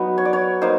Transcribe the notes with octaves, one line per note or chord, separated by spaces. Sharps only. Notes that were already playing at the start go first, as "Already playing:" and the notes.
Already playing: F#3 B3 D#4
C#5
D5
C#5
A#3 D#4 C5